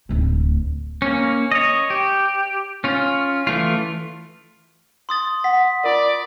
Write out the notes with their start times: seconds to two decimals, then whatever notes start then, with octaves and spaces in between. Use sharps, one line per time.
0.09 D1 D2
1.02 A#3 C#4
1.51 C#5 D#5
1.90 G4
2.84 C#4 F4
3.47 E3 A3 F4
5.09 C6 D#6 A6
5.44 F#5 B6
5.84 F4 A#4 D5